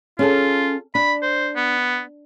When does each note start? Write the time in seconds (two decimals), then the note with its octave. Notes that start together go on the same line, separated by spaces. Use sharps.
0.19 C#4 F4 G#4 A4
0.95 D4 B5
1.23 C5
1.56 B3